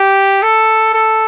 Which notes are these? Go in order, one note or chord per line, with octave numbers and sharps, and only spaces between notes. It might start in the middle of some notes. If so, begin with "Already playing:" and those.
Already playing: G4
A4
A4